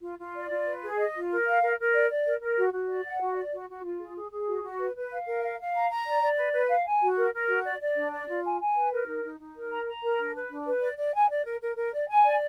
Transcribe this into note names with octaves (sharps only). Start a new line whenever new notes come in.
F4
F4
D5
F4
B4
G#4
D#5
F4
A#4
F5
A#4
A#4
D5
D5
A#4
A#4
F#4
F#4
D5
F#5
F#4
D5
F#4
F#4
F4
G#4
G#4
G#4
F#4
F#4
B4
B4
F5
A#4
F5
F5
A#5
A#5
D5
D5
B4
B4
F5
G#5
F#4
A#4
A#4
F#4
D5
D5
D4
D5
F4
G#5
G#5
B4
A#4
D#4
D#4
D#4
A#4
A#5
A#5
A#4
D4
B4
D4
B4
D5
D5
G#5
D5
A#4
A#4
A#4
D5
G#5
D5